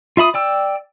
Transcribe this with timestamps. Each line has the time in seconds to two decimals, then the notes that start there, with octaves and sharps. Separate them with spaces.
0.17 F4 E5 B5 D#6
0.34 D5 G5 E6